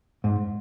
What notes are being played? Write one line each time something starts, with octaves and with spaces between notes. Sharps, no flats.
G#2